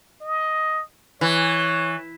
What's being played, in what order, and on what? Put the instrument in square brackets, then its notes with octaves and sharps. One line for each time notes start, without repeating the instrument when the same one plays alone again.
[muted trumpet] D#5
[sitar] E3 [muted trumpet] C#5